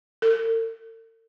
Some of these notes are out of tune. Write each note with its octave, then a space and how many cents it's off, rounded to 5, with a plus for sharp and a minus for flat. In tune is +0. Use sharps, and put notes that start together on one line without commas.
A4 +45